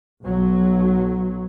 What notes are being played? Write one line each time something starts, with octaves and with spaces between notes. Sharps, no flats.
B1 F#3